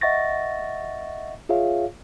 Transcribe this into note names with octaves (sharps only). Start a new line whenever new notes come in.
D#5 E5 F#5 C#6 A6 A#6
F4 G#4 C#5 E5 F5